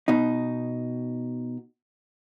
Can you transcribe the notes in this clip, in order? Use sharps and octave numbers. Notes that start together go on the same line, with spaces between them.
B2 D#4